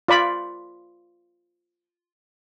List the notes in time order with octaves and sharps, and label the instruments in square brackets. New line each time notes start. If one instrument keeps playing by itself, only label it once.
[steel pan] F4 D5 B5